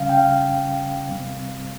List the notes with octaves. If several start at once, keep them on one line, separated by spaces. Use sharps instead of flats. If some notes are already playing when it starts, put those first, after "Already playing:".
Already playing: C#3 G3 C#4 F5
G5
F5
C3 G3 C4